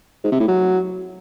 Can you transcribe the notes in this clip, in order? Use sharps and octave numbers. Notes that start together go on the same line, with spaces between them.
G#2
C3
A2
F#3